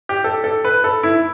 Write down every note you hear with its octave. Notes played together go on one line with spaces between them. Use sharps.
G4
A4
A4
B4
A4
E4